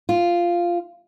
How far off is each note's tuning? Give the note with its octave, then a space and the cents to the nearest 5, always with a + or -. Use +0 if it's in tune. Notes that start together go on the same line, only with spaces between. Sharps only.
F4 -5